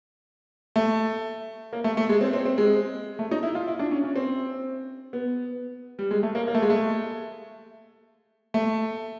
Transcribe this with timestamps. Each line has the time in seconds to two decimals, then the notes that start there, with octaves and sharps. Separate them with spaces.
0.76 A3
1.73 A#3
1.84 A3
1.97 A3
2.09 G#3
2.21 C4
2.33 C4
2.45 C4
2.58 G#3
3.19 A3
3.31 D#4
3.43 E4
3.55 F4
3.68 E4
3.79 D4
3.91 C#4
4.04 C#4
4.16 C4
5.13 B3
5.99 G3
6.11 G#3
6.23 A3
6.35 A#3
6.47 A#3
6.55 A3
6.62 G#3
6.70 A3
8.54 A3